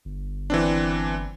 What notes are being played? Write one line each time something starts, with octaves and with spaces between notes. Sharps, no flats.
G1
E3 C4 D4